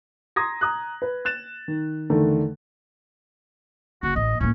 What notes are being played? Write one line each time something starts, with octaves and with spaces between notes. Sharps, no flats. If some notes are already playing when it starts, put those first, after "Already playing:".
A#5 C6 D#6 G#6 A#6
A#5 D#6 F#6
B4
F#6 A6 E7
D#3
E2 D3 D#3 A3
F#1 F#4
A1 D#5
A2 A#3 C#4